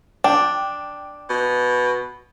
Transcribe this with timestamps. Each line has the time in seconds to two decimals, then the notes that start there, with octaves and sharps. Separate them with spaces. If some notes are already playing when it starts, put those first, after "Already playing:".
0.24 D4 G5
1.30 B2